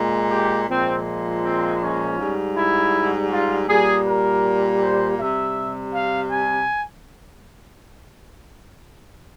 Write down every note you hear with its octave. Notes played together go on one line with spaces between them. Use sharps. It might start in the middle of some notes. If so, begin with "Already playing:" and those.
Already playing: A#2 G#3
G4
A#2 F3 G#3 C4
C4
C#4
G#2 G3
E4
F4
A#2 G3 G#4
A#4
C5
C3 G3 E5
F5
G#5